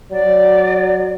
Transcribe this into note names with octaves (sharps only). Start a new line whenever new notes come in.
F#3 D5